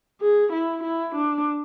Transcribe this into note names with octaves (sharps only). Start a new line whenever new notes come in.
G#4
E4
E4
D4